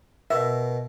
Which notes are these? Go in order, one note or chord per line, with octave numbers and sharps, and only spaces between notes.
B2 A#4 E5